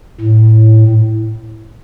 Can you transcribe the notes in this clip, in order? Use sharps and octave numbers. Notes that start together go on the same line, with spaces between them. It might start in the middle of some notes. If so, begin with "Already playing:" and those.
A2